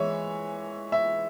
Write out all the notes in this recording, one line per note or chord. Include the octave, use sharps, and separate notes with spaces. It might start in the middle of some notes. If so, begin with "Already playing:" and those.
Already playing: E3 G#3 C#5 E5
E5